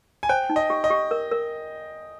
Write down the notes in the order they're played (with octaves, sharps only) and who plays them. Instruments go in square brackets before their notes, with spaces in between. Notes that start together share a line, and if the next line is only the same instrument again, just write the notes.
[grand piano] G#5
[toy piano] C5 [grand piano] G5
[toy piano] D#4
[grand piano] D#5
[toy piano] G4
[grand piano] D#5
[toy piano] G4
A#4
A#4